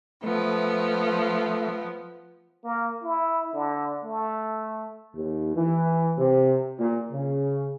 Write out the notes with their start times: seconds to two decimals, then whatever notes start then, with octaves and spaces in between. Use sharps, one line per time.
0.24 F3 A3 B3
2.64 A#3
3.03 E4
3.53 D3
4.03 A3
5.16 D#2
5.56 E3
6.18 C3
6.79 A#2
7.12 C#3